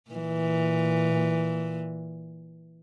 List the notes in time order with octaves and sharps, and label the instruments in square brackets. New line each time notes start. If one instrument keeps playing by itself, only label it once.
[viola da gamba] A#2 E3